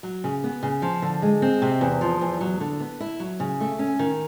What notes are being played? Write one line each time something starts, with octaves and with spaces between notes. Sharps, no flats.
F#3
C#3
B3
C#3
F3
D3
G#3
C4
C3
E2
F3
E2
F#3
D3
B3
E4
F#3
C#3
A3
C#4
D#3